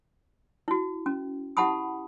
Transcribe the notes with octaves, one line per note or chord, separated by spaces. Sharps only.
E4 F#4
C#4
E4 G4 F#5 A5 B5 D#6